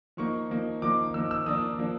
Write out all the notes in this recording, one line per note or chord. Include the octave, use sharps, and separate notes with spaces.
F3 A#3 D#4 C#6
F3 A#3 D#4
F3 A#3 D#4 D6
F3 A#3 D#4 E6
E6
F3 A#3 D4 D#6
F3 A#3 D4